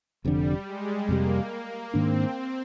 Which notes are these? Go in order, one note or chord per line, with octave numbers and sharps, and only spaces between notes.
F1 F2 D3 G3
G#3
F2 C3 G3 A#3
G#2 D#3 A#3 C4 D4